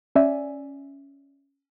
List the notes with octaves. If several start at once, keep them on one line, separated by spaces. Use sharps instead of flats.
C#4 D5 E5 G#5